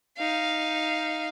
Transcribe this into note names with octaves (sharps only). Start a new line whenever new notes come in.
D#4 F5